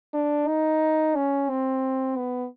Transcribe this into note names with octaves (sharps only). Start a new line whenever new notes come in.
D4
D#4
C#4
C4
B3